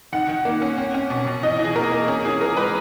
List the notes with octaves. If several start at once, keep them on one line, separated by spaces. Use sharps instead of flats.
D#3 F#5
D#3
A#3
C#4
C#4
C#4
B2
B2
E3 D#5
E3
G#4
A#3 A#4
A#3
C#4 G#4
E3 G#4
E3 A#4
G#3 B4